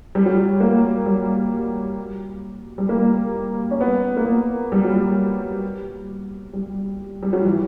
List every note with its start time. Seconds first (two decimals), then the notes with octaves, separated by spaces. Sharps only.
0.15 G3
0.26 F#3
0.36 G3
0.60 A#3
1.06 G3
2.78 G3
2.89 A#3
3.71 C#4
3.80 B3
4.17 A#3
4.25 B3
4.72 G3
4.84 F#3
4.97 G3
6.53 G3
7.23 G3
7.33 F#3
7.45 E3